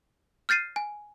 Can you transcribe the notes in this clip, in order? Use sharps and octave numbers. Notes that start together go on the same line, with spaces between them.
F6 G6 A6 C7 D#7
G#5